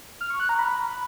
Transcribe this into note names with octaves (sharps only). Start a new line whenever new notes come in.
F6
C#6
F#6
A#5
B5